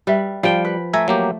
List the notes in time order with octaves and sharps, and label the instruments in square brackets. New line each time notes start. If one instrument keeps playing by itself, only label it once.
[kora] G3 [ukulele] B4 E5
[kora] F3 G5 [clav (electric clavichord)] G3 [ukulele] F5
[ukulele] B4
[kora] A3 [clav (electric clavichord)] E5 G#5 A#5
[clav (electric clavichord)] F#3 A#3 G4